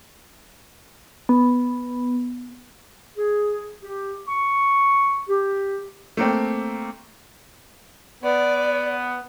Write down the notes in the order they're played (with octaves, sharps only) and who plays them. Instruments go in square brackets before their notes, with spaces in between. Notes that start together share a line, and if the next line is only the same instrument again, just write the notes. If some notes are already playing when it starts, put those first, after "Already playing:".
[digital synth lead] B3
[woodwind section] G#4
G4
C#6
G4
[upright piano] A3 A#3 C4
[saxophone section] B3 [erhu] D5